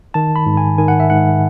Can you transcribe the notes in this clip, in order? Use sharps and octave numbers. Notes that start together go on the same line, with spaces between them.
D#3 A5
B5
G#2
G#5
D#3 G#5
F#5
E5
G#2 F#5